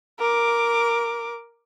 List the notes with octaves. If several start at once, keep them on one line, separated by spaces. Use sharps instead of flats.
A#4 D6